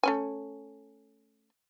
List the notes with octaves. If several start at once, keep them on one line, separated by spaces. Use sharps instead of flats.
A3 C#4 G#5